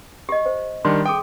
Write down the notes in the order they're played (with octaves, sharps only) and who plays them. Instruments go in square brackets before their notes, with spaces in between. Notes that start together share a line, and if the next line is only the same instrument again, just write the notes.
[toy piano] G4 D#5
C5
[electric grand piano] D#3 G3 D4 [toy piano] C6
[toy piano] G#4 A4 [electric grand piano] G5 D#6